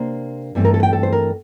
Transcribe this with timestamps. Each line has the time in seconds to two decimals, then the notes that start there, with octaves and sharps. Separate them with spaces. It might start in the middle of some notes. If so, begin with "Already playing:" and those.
Already playing: C3 A#3 D4 C5
0.55 G2 E3 A3 C4
0.65 A#4
0.74 A4
0.83 G5
0.93 A4
1.03 C5
1.12 A#4